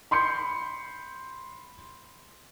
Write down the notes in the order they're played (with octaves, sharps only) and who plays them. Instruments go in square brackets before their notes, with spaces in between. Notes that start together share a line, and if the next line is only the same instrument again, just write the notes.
[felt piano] B5 C6 G6 C#7